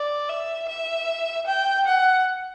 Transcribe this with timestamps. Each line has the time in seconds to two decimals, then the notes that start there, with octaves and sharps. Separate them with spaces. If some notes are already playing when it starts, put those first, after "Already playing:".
Already playing: D5
0.29 E5
0.68 E5
1.47 G5
1.86 F#5